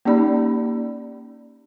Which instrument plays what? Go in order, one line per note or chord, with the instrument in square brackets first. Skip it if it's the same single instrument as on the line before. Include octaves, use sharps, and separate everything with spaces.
[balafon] A#3 C#4 D#4 G4 D5 B5